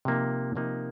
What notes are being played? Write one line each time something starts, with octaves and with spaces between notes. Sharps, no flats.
C3 F3 A#3 D#4
C3 F3 A#3 D#4